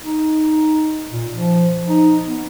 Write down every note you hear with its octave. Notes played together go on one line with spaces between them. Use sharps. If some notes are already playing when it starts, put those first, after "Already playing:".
D#4
A#2
F3
D#4
B3